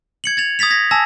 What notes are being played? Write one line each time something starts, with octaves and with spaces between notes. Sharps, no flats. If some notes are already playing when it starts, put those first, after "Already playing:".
G#6 C#7 F#7
G#6 A6 F7
D#6 G#6 A6 B6 F7
G#6 A#6 B6
G#5 A5 E6 A#6